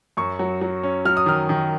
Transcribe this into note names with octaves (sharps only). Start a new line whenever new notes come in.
F#2 C#6
F#3
F#3
C#4
F#3 F6
D#6
D#3 F6
D#3